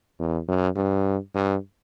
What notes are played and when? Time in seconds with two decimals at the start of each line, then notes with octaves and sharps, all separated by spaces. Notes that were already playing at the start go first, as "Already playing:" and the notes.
0.19 E2
0.48 F#2
0.76 G2
1.35 G2